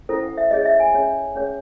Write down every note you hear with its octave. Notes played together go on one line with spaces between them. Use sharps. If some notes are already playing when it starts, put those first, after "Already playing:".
C#4 E4 A4 C5
F#5
E5
C#4 G#4 C#5 D#5
E5
G#5
C#4 G#4 C#5
C#4 G#4 C#5